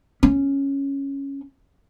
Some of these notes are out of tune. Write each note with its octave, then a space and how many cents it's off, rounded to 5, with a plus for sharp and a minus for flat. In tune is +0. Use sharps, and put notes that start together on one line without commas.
C#4 -5